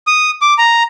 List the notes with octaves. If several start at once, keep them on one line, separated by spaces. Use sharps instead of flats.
D#6
D6
A#5